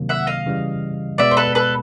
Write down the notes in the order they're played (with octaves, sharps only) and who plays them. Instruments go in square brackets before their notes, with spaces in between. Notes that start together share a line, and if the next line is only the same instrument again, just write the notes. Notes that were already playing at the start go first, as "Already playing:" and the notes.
Already playing: [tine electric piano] C3 D#3 F#3 A#3
[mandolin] E5 F#5
D#5 F5
[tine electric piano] C#3 E3 G3
[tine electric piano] B2 G#3 B3 [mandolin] D5 E5
[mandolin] C5
A4 B4
A4 B4